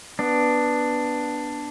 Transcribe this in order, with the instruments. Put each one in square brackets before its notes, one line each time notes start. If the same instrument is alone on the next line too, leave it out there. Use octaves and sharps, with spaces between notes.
[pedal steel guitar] B3 D4